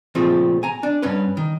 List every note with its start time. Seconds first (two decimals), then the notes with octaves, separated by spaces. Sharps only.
0.15 A#2 C#3 F3 A3 C4
0.63 G#5 A#5
0.83 D4
1.02 G2 C#4 B4
1.37 D#3